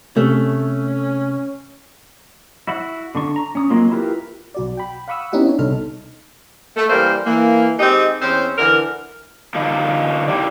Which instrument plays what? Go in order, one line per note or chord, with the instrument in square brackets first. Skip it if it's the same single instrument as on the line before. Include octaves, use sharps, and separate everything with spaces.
[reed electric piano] C3 [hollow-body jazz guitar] A3 [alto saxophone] C#4
[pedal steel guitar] E4 F#4 E5 F#5
D3 D4 C#6
A#5
C#4 D#6
F#3 G#3 A#3 C4 F4
E4 F4 G4 A#4 B4
[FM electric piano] B1 F#4 D5
G5 B5
F5 F#5 B5 C#6 D#6 E6
B3 C#4 D#4 E4 G4 F#5
D4 C#5
C2 B2 D#4 A4 F6
[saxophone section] A3
E3 G3 A#3 A#4 C5
E3 A#3
G#3 C4 D#4 G4 D#5
E2 C4 C#4 C5
D3 E3 A#4
[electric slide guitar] D3 A3 D4 D#4 F4
E4 F4 G4 D5